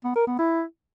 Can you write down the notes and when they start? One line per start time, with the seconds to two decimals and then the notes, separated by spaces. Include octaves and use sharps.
0.04 B3
0.16 A#4
0.27 B3
0.39 E4